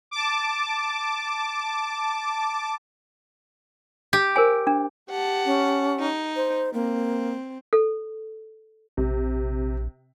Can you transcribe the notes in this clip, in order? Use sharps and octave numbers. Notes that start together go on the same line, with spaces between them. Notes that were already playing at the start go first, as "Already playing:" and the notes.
A5 D6
G4
A#4 C5 G#5
D4
G4 F#5 A5
C#4
D#4
C5
A#3 C4
A4
A#1 C3